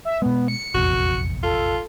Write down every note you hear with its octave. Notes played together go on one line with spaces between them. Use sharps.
E5
B2 G#3 B3
C#7
F1 A#1 E2 F#4
F4 A4